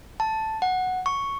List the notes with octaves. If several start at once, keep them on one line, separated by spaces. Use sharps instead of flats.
A5
F#5
C#6